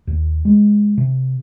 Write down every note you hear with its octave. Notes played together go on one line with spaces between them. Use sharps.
D#2
G#3
C3